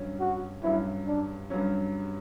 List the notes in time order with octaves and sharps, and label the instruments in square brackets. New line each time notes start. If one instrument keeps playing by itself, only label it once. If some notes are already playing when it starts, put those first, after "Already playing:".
Already playing: [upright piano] G2 F#3 C#4
[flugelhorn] F#4
[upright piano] G2 F#3 C#4 [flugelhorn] E4
[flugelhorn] D4
[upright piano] G2 F#3 C#4